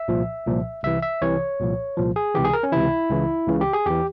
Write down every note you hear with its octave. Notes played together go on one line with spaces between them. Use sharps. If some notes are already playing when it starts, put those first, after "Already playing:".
Already playing: E5
C2 A#2 F3
C2 A#2 F3
C2 C3 E3 E5
E5
C2 C3 E3 C#5
C2 A#2 F3
C2 A#2 F3
G#4
C#2 C3 E3 G4
G#4
A#4
C#4
C#2 C3 E3 E4
C#2 C#3 E3
C#2 C#3 E3
G4
G#4
E2 E3 G4